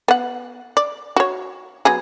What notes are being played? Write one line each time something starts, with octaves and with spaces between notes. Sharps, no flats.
B3 F#5
D5
F#4 C#5
F#3 B3 G#4